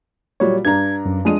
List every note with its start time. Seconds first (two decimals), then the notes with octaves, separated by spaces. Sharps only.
0.40 A#2 F#3 G3 C#5
0.65 G2 D4 A#5 G#6
1.05 F#2
1.25 F2 G#3 D4 D#7